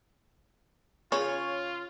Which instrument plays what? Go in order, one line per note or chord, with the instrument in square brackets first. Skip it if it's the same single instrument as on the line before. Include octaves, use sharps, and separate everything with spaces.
[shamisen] C#3 C#4 B5 [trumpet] F4 [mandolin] C#5